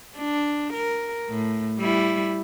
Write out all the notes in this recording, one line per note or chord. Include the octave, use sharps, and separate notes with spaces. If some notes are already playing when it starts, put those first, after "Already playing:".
D4
A#4
A2
G3 E4